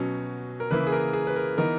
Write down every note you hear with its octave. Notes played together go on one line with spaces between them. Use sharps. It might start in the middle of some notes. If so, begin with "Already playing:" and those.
Already playing: B2 F#3 C#4
A#4
C#3 E3 A#3 E4 B4
G#4
A#4
G#4
B4
A#4
E3 B3 D#4 A#4